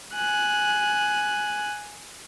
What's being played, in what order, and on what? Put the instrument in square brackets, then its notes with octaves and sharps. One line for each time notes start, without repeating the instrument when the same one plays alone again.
[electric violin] G#5 F#6